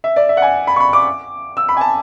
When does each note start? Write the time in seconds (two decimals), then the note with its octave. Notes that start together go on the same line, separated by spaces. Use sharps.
0.04 E5
0.16 D5
0.29 E5
0.37 F#5
0.42 G#5
0.67 B5
0.76 C#6
0.80 B5
0.93 D6
1.57 E6
1.69 B5
1.77 G#5
1.81 A5